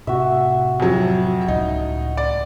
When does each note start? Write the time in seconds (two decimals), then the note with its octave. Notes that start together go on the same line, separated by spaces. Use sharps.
0.07 A2 C3 F#4 E5
0.80 F2 F#3
1.48 C#2 A2 D#4
2.17 D5